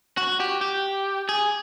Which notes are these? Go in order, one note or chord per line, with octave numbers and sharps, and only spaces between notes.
F#4
G4
G4
G#4